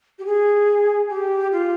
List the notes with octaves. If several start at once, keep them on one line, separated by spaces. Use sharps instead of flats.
G4
G#4
G4
F4